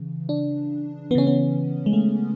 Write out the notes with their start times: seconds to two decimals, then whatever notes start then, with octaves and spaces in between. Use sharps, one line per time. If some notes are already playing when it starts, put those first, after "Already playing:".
Already playing: C#3 E3
0.29 D4
1.11 E3 B3
1.15 C#3 C#4
1.27 B3
1.86 G#3
1.93 A3